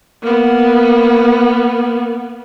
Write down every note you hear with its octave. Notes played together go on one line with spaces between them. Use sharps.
A#3 B3